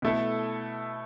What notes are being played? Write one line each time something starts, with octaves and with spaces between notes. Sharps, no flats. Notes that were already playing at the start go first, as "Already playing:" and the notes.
B2 A3 E4 A4